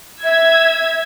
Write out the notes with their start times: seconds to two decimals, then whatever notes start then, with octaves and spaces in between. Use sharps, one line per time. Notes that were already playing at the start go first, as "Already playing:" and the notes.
0.24 E5 E6 G#6